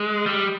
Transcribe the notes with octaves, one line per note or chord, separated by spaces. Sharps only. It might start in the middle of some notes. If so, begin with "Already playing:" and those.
Already playing: G#3
G3